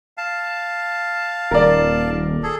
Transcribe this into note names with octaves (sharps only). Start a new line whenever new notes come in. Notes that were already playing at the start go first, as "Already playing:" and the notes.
F5 A5
D#1 A#4 D5
G#4 A4